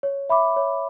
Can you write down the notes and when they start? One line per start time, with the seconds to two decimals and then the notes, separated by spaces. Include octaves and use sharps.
0.03 C#5
0.29 E5 B5 D6
0.56 C#5